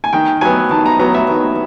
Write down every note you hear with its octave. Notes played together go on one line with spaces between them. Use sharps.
G#5
D#3 G5
F#3 B3 G#5
D#3 A5
A#5
F#3 B3 A#5
E5
D#3